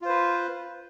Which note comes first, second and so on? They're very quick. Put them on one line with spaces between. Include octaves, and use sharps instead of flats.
F4 C5 B4